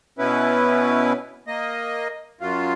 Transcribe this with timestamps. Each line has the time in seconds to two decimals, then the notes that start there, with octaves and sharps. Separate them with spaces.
0.19 B2 B3 C#4 E4 B4
1.47 A#3 D#5
2.41 F#2 F#3 F4